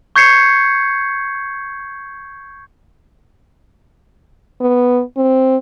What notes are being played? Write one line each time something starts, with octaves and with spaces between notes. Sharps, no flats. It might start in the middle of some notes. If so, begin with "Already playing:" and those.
C#6 G6 G#6 C7 C#7
B3
C4